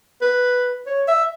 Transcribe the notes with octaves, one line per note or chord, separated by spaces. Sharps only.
B4
C#5
E5